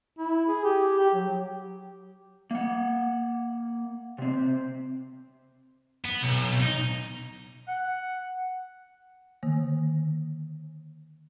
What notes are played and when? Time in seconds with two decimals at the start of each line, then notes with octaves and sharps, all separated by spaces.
0.18 E4
0.48 G#4
0.65 G4
0.99 G4
1.14 F#3
2.51 A#3 F#5
4.18 C3 C4
6.05 B3
6.22 B1
6.61 D#4
7.68 F#5
9.43 D3 D#3 A#3